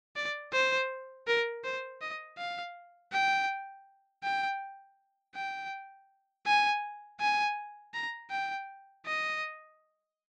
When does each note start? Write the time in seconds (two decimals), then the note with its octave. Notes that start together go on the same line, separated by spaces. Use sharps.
0.16 D5
0.53 C5
1.28 A#4
1.64 C5
2.01 D#5
2.38 F5
3.12 G5
4.24 G5
5.35 G5
6.46 G#5
7.20 G#5
7.94 A#5
8.31 G5
9.06 D#5